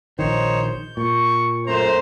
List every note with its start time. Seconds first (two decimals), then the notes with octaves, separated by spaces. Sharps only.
0.19 A#1 D#3 D#4 C5 C#5
0.62 G6
0.97 A#2 C#6
1.67 F#2 A3 C5 A#5